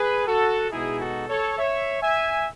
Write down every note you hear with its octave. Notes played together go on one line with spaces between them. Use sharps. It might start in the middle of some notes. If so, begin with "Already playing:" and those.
Already playing: G#4 B4
F#4 A4
B2 G#3 D#4 E4 G#4
F#4 A4
A4 C#5
C#5 E5
E5 G#5